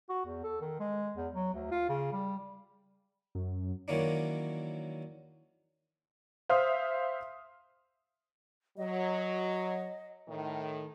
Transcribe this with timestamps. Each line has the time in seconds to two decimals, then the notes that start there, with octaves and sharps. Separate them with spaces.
0.09 F#4
0.26 E2
0.43 A4
0.61 D#3
0.80 G#3
1.16 E2
1.34 F#3
1.54 D2
1.71 F4
1.89 C#3
2.12 G3
3.35 F#2
3.88 D#3 E3 F#3 A#3 C#4 D4
6.49 C5 E5 F5 D#6 F6
8.77 F#3 D#5
10.28 A2 D#3